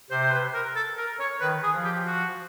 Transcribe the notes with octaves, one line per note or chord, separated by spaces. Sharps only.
C3 C5
C5
B4
A#4
A4
A#4
C#5
D#3 B4
G#4
F3
G4
F#4